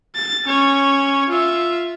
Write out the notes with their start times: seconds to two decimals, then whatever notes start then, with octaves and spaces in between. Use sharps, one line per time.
0.15 A6
0.46 C#4 C#5
1.29 F4 E5